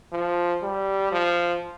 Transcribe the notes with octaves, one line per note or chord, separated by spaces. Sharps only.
F3
G3
F3